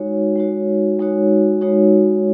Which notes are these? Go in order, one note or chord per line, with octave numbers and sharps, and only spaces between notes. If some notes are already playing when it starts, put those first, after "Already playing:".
Already playing: G#3 D#4 F#4 C#5
G#3 D#4 F#4 C#5
G#3 D#4 F#4 C#5
G#3 D#4 F#4 C#5